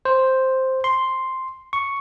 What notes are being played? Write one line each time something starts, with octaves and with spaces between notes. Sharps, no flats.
C5
C6
C#6